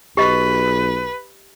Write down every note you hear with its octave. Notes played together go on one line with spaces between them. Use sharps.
B1 G4 B4 D#5